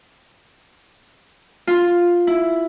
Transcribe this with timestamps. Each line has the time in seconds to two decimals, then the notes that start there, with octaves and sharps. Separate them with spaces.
1.67 F4
2.27 E4